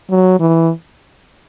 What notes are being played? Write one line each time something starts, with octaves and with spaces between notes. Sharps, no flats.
F#3
E3